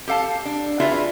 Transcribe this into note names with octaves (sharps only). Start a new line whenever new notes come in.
G4 A4 F5 A5
D4
F4 F#4 G#4 B4 D5 E5